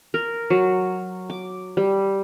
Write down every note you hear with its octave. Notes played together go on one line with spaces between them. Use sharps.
A#4
F#3
D6
G3